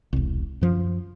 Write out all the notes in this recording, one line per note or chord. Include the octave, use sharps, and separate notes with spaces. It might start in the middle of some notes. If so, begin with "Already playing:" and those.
E1 C2
F#2 F3